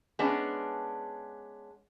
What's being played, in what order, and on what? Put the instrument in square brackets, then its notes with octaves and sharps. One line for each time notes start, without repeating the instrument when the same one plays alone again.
[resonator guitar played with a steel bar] G#3 B3 C#4 D4